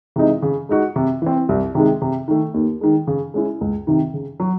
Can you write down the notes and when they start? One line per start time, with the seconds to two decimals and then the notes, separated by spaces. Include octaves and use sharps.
0.16 C3 E3 G#3 D#4
0.42 C#3
0.69 G#3 D#4 F#4
0.96 C3
1.22 E3 C4
1.49 C2
1.75 C3 D#3 G#3
2.02 C3
2.28 D#3 A3
2.54 D#2
2.81 D#3 G#3
3.07 C#3
3.34 G#3 C#4 E4
3.61 C#2
3.87 C3 D#3
4.14 C#3
4.40 F#3